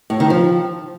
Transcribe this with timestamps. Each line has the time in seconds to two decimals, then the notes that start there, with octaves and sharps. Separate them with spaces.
0.10 A2
0.20 D#3
0.30 F3